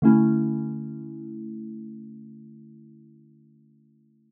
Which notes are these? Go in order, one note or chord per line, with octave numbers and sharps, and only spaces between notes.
D3 A3 C#4 E4